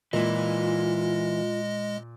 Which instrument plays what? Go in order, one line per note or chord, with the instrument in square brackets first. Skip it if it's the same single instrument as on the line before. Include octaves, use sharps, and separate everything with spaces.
[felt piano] A#2 [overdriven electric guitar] E3 [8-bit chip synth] G#3 D#5 [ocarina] F4